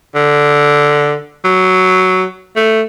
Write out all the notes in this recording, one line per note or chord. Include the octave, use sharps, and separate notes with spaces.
D3
F#3
A3